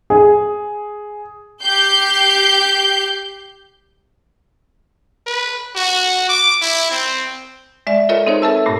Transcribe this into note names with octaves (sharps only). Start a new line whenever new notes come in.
G#4
G4 G6 C7
B4
F#4
D6
E4
C4
G#3 D5 E5
F4 A4 A#4 C#5 D#5 E5
C4 D#4 G#4 A#4 C5 C#5
A4 B4 E5 A5 E6
G2 A#2 A3